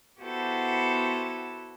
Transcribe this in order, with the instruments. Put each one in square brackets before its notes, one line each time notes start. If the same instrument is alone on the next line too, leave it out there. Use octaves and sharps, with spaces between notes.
[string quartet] B3 E4 F#4 G4 A4 C5